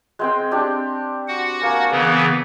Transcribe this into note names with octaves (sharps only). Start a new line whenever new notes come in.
G#3 C4 G5
C4 D4 G4
F#4 F#5
A#3 G#5
C#3 E3 B3